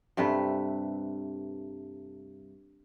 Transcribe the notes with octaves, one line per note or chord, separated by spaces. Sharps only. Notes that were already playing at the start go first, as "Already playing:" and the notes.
G2 C3 A3 B4